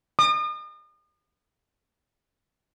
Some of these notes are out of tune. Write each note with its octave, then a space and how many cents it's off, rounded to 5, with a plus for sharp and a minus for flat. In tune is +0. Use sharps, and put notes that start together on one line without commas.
D#6 -40